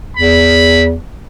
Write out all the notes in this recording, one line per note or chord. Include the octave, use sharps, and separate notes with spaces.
E2 B5